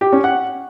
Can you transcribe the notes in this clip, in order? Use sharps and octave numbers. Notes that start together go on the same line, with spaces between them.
G4
C#4
F#5